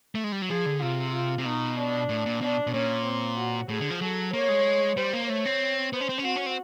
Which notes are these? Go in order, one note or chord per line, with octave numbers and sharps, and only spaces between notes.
A3
G#3
G3
F#3
F3 G#4
D3
C3 F4
F4
C3
B2 D#4
D4
A2
A#2
B2 D4
B2
A#2 C#4
C4
F#4
A2 G#4
D3
F3
F#3 A4
A#3 C#5
G#3
G3 C5
A#3
A3 C#5
C4
B3 C5
C#4
C4
C#4
C4 F#4
C#4
C4